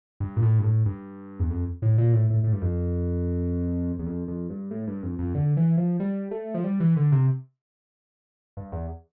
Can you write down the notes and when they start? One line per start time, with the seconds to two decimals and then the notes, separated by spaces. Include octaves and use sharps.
0.20 G2
0.36 A#2
0.42 A2
0.59 G2
0.64 A2
0.86 G2
1.39 E2
1.50 F2
1.82 A2
1.98 A#2
2.13 A2
2.30 A2
2.44 A2
2.53 G2
2.62 F2
3.99 E2
4.06 F2
4.28 F2
4.50 G2
4.71 A2
4.87 G2
5.03 F2
5.19 F2
5.35 D3
5.57 E3
5.78 F3
6.00 G3
6.31 A3
6.54 F3
6.64 G3
6.80 E3
6.96 D3
7.12 C3
8.57 G2
8.72 E2